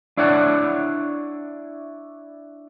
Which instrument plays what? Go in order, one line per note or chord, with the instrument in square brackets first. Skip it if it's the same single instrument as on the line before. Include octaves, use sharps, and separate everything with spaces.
[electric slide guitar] D4 E4 C#5 D5 F#5